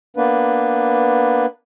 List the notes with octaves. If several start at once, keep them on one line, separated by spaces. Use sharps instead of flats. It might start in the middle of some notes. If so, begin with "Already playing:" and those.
A#3 B3 D4 B4